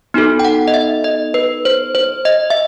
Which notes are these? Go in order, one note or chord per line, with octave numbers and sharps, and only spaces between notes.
B3 D#4 F#4 A4
G5
F#5
D#5
E5
D#5
B4
C5
C5
D#5
E5